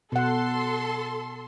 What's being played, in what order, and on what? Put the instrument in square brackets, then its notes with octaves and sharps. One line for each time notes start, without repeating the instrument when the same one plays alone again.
[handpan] B2 F#5 [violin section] A4 C6